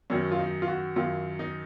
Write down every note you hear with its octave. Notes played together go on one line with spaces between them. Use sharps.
F#2 D#3 F#3 C#4
F4
D#4
F4
F#4
F#2 D#3 F#3 F4
D#4